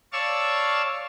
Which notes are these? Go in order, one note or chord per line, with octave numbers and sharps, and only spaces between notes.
C#5 D5 F5 A5 C#6 E6